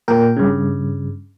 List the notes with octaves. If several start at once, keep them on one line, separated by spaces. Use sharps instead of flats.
A#2 A#4 G5
G2 C#3